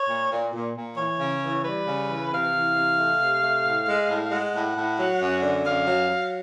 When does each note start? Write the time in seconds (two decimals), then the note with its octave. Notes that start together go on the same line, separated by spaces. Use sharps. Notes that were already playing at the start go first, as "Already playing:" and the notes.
Already playing: C#5
0.08 A#2
0.31 A#2
0.53 A#2
0.75 A#2
0.97 E3 C#5
1.20 C#3
1.42 E3
1.64 G3 B4
1.86 C#3
2.08 E3
2.31 C3 F5
2.53 E3
2.75 C3
2.97 A3
3.20 C3
3.41 A3
3.64 A2
3.86 G#3
4.08 A2
4.31 G#3 F#5
4.53 A2
4.75 A2
4.97 F#3
5.20 F#2
5.42 D3
5.64 F#2 F5
5.86 F#3
6.09 F#3